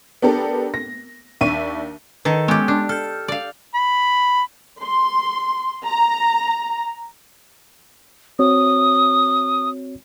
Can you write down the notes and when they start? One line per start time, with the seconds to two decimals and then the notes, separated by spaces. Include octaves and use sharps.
0.22 B3 D4 G4 A4 A#4
0.74 A#6
1.41 D#2 D4 E5 C#6 D#7
2.25 D#3 A4 B4
2.48 G#3 B3 C#4 G4
2.68 D4
2.89 A4 F6 G6
3.28 D5 F5
3.75 B5
4.82 C6
5.86 A#5
8.39 C4 F#4 C#5 D#6